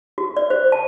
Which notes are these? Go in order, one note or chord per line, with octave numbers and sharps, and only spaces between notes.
F#4
D5
C5
A5